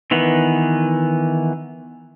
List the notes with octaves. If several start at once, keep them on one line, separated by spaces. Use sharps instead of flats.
D#3 E3 B3